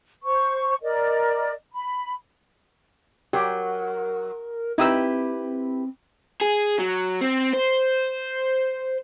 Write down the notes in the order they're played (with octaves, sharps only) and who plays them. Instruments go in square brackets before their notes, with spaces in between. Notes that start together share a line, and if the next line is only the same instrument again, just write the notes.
[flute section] C5 C#6
A#4 D5 D#5
B5
[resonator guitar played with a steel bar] F#3 [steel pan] G4 [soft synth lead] A#4
[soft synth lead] C4 [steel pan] D#4 D#6 E6 [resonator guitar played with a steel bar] E4 G4 B4
[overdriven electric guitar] G#4
F#3
C4
C5